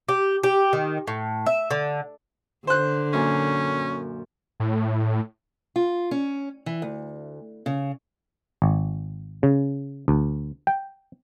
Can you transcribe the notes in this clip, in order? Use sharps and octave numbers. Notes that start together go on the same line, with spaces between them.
G4
G4
D#3
A2
E5
D3
D3 C5 F#6
F#2 A#2 C#4 G#5
A2
F4
C#4
E3
D2
C#3
G#1
C#3
D2
G5